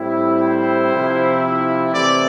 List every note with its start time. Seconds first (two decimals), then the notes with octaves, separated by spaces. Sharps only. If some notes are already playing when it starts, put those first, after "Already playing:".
Already playing: A2 G3 C4 E4
0.43 C5
0.93 C3 F3 C4 E4
1.94 C3 E3 A3 C4 E4 D5